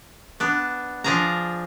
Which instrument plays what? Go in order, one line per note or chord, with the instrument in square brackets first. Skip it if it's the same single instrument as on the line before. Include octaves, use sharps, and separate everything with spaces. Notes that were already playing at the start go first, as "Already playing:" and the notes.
[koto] B3 D4
F3 D4 G#4 F5 A#5